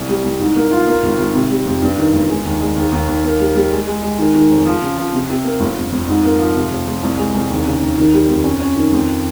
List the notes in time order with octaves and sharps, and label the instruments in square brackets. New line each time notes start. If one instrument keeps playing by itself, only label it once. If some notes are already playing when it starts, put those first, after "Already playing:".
Already playing: [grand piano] C2
G3
C2
G#2
A#3
F4
A#3
G#1
G#1
C3
G3
F2
G2
D#3
G1
G#3
D#2
G#3
D#2
D#2
D#2
A#3
G3
G3
G#3
G#3
G#3
D#3
D#3
F1
F3
C#3
F3
C3
C3
A#3
G1
F2
F2
G#2
A#3
F3
C3
F1
F2
C2
G#3
C2
D#2
C#3
D#2
D#3
G3
F2
C#4
C#4
D#3
F2